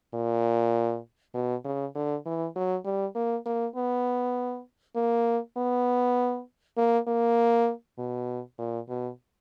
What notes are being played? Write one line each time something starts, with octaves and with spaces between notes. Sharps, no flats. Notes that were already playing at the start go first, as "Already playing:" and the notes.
A#2
B2
C#3
D3
E3
F#3
G3
A#3
A#3
B3
A#3
B3
A#3
A#3
B2
A#2
B2